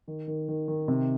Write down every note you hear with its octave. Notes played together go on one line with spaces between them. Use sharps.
D#3
D#3
D#3
D#3
C3